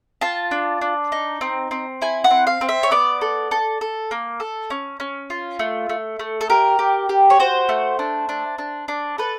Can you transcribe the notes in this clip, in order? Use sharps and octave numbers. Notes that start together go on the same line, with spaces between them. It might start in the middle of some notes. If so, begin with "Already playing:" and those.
F4 A5
D4
D4
D#4
C4
C4
E4 G#5
F#5
C4
F5
C4
E5
C#5
B3 D5
A4
A4
A4
A#3
A4
C#4
C#4
F4
A3
A3
A3
A4
G4 A#4
G4
G4
C#5
F#4 C5
A3
D4
D4
D4
D4
A4 B4